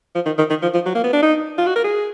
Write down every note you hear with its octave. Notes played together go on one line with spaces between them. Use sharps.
F3
D#3
D#3
D#3
F3
F3
F#3
A#3
B3
D4
D#4
F4
F#4
A#4
G#4